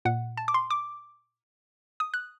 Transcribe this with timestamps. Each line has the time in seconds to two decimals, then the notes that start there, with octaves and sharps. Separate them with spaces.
0.05 A#2 F#5
0.37 A5
0.48 D6
0.54 C6
0.71 D6
2.00 D#6
2.14 F#6